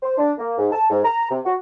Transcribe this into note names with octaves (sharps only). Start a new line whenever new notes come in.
C5
D4
A#3
G#2
A5
G#2
A#5
C3
F#4